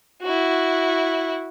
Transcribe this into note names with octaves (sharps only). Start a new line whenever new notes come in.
E4 F#4